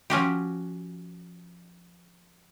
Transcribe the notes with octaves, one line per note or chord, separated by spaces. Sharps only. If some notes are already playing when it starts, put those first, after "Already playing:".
F3 C#4 F#4 G4